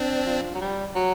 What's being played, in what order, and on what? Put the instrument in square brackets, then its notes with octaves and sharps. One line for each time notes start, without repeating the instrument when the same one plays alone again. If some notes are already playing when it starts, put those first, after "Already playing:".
Already playing: [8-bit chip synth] C4 D4
[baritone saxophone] F3
F#3
G3
F#3